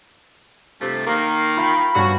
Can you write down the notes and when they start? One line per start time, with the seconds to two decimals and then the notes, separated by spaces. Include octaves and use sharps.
0.81 G2 C3 F3 A3
1.07 D#3 A#3
1.57 F4 F5 G5 B5
1.95 G2 F3 B3 C#4 F#4